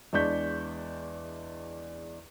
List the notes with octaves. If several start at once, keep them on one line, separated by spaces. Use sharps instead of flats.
E2 G#3 D4 C#6 G6 B6